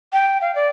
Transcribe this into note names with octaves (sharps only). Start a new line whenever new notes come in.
G5
F5
D5